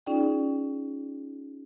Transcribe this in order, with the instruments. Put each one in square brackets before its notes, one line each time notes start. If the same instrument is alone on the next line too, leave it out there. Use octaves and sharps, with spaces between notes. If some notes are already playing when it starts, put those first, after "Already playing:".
[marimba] C#4 D#4 F4 G#4 D5 G5